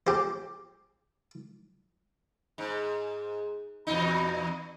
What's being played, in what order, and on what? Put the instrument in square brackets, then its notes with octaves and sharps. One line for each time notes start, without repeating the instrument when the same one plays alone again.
[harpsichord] G4 C5
[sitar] G#2
E2 B2 D#4